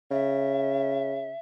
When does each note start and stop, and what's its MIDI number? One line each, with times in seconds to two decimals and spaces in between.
0.11 1.32 49
0.11 1.40 76